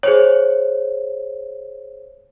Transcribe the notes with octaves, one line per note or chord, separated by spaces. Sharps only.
G#4 C5 C#5